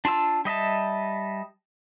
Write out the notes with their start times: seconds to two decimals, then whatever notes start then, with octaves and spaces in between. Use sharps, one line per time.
0.05 D4 F4 A5 E6
0.45 G3 D#5 E5 A5